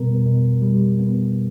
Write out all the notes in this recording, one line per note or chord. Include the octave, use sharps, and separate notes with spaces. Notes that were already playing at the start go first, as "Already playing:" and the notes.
Already playing: B2 G3 B3 A#4
B2
G3
B3